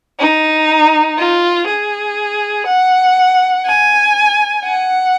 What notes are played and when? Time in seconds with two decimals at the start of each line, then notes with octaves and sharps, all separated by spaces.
0.19 D#4
1.18 F4
1.68 G#4
2.67 F#5
3.66 G#5
4.65 F#5